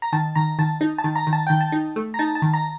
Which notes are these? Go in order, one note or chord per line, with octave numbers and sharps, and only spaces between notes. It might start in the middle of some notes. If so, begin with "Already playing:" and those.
A#5
D#3 A5
D#3 A#5
D#3 A5
D#4
A5
D#3
A#5
D#3
A5
D#3 G5
A5
D#4
A3
A#5
D#4 A5
A5
D#3
A#5